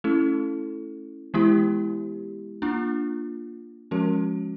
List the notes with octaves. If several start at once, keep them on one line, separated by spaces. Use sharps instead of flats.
A3 C#4 E4 A4
E3 G#3 B3 E4 G4
A#3 D4 F4
F3 G#3 C#4 F#4 A#4